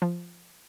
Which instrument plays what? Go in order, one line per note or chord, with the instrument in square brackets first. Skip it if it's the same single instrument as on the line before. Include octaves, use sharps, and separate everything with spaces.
[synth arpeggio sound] F3